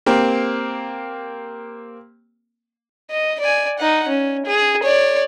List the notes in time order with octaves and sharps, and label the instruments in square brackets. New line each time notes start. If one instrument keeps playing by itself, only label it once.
[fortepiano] A#3 C4 G4
[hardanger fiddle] D#5
D5 G#5
D#4 F#5
C#4
G#4
C#5 D5